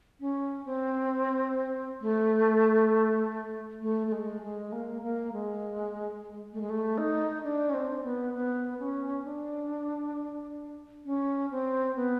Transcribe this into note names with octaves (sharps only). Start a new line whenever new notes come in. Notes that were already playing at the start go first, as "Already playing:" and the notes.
C#4
C4
A3
A3
A3
G#3
G#3
A#3
A#3
G#3
A3
G#3
A3
D#4
D4
C#4
C4
B3
B3
C#4
D4
C#4
C4
B3